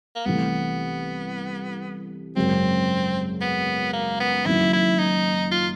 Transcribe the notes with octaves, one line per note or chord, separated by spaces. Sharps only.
A#3
C2 C3 E3 A3 B3
G#1 F#2 C#3 C4
B3
A#3
B3
F#1 F#2 D#3 E4
E4
D#4
F4